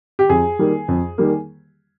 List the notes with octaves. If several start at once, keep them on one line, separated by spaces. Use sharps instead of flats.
G4
F2 G#4
D#3 G3 A#3
F2
D#3 G3 A#3